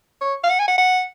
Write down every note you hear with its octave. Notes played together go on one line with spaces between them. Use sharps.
C#5
F5
F#5
G#5
F#5
F#5